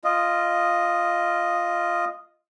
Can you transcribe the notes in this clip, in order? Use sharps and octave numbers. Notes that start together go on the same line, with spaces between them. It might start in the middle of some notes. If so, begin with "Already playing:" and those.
F4 D#5